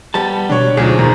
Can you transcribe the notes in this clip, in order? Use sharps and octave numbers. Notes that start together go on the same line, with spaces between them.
G3 B3 A5
B2 D4 C#5
D2 F#3 D#4 F4 G#4 C5
E2 A#2 D#3 A#5